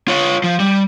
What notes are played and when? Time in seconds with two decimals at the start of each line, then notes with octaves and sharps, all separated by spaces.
0.08 F4 C#5
0.44 F3
0.60 G3